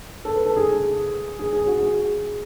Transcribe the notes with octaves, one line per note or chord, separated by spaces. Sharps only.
A4
B4
A4
G#4
G#4
G#4
F#4
G#4